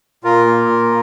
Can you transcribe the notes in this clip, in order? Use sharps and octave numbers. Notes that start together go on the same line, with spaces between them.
A#2 F4 A#4
A#3
A#2